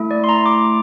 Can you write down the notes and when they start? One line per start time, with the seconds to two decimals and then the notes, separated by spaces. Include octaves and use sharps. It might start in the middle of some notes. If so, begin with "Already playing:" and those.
Already playing: A3 E4 A4
0.11 D5
0.24 C6
0.29 A#5
0.46 D6